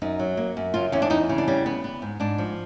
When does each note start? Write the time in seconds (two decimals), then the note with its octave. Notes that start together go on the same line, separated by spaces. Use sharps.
0.02 F#2 D#4
0.19 F#3
0.37 A#3
0.57 F#2
0.74 C#3 F4
0.92 E2 C#4
1.02 D4
1.10 E2 D#4
1.29 C#3
1.38 D4
1.48 G3 C#4
1.66 B3
1.84 B3
2.02 G#2
2.20 G#2 D4
2.38 F3